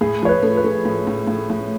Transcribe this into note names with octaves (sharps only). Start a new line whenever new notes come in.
A2 G#4
F3 C#5
B4
A3
B4
A3
A2
A2
A2
A2